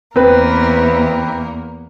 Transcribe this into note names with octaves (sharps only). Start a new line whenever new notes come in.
E2 A#3 C4 B4